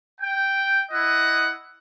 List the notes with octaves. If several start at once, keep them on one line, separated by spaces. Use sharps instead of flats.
G5
E4 D#5 F#5